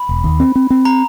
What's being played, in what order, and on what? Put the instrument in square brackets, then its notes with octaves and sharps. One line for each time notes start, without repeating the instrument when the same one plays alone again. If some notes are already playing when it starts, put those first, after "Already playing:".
Already playing: [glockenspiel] B5
[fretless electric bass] E1
D#2
C4
C4
C4
[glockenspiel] A#5